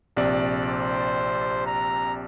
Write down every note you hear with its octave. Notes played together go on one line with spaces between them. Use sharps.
A#1 C3 D5
C5
A#5